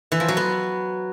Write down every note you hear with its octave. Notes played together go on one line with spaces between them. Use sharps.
E3
F3
F#3
B3